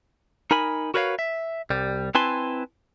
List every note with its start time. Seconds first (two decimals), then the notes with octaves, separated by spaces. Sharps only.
0.51 D#4 A#4 G#5 B5
0.94 F#4 A#4 B4 C#5 E5 F5
1.19 E5
1.70 C2 G3
2.15 C4 E4 B4 G#5 A5 C6